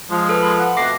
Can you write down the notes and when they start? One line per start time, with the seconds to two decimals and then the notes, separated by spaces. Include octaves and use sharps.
0.11 F3 G#3
0.29 A4 B4
0.43 G#3 B5
0.59 F#5
0.77 F2 B2 A3 D6 A#6 C7